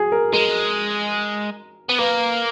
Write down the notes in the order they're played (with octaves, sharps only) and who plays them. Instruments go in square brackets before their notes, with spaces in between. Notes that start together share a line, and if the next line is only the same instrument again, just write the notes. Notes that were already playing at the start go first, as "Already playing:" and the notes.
Already playing: [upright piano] F#4 G#4
A#4
[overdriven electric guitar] G#3 [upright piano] A#4
[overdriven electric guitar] B3
[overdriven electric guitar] A#3 [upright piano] B4